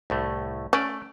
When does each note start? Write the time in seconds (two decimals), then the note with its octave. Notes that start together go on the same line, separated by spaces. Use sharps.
0.10 C2 A2 A3
0.73 A3 C#4 D5